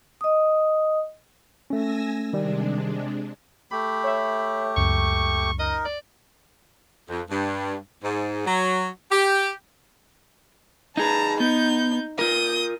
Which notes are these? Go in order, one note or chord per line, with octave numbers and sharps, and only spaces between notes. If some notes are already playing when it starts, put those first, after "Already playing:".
D#5 D#6
A3 C#4 G#5 E6 A#6
C3 D#3 G3 G#3 D4
A3 G4 B5
C#5 E5
C#2 F#2 C#6
D#4 A#4 D#5
D5
F2
G2
G#2
F#3
G4
D#4 G#4 B4 A5 A#5
B3 D#4 G6
F4 A#4 D#6 G6